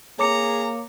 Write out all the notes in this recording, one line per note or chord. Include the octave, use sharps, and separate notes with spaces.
A#3 G#4 C#5 A#5 D6 C#7